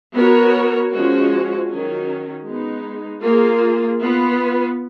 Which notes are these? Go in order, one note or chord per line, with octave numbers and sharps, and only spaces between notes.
B3 F#4 A#4 C#5
F3 G#3 C#4 F#4
D#3 F#3 C#4
G#3 B3 D#4
A#3 F4 G#4
B3 F4 B4